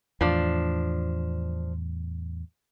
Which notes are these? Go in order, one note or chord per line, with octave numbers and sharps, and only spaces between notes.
E2 A2 F3 D4